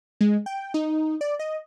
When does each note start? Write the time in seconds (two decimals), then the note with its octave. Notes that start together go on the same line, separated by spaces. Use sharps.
0.21 G#3
0.46 G5
0.74 D#4
1.21 D5
1.39 D#5